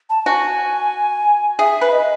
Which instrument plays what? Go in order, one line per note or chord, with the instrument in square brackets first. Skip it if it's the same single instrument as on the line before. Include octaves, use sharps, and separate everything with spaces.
[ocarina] A5
[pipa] F#4 [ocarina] G#5
[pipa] G#4 [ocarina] E5
[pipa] B4
[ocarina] D#5